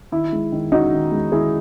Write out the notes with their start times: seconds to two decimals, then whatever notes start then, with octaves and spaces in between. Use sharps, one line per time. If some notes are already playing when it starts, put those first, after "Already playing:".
0.12 D#3 E4
0.32 G#3
0.52 D#3
0.72 C#4 D#4 F#4
0.92 D#3
1.12 G#3
1.32 D#3 E4 G#4